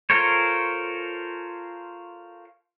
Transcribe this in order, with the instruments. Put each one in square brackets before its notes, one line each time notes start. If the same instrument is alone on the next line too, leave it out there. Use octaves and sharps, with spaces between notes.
[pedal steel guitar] F4 A4 A#4 C5 C#5